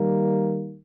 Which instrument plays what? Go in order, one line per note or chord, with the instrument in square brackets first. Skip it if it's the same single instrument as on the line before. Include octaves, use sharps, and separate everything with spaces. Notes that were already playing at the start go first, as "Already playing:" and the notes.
Already playing: [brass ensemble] D#3 G3 A#3